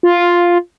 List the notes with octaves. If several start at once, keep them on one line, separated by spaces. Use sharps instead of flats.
F4